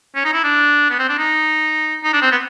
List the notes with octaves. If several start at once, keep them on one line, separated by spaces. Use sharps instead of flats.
C#4
D#4
E4
D4
B3
C4
D4
D#4
D#4
D4
C4
B3